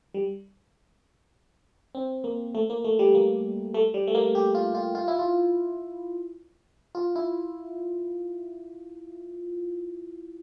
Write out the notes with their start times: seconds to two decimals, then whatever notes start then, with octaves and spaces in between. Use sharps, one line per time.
0.14 G3
1.95 C4
2.24 A#3
2.55 A3
2.70 A#3
2.84 A3
2.99 G3
3.15 A#3
3.74 A3
3.94 G3
4.07 A3
4.15 A#3
4.35 G4
4.55 F4
4.75 F4
4.95 F4
5.08 E4
5.19 F4
6.95 F4
7.16 E4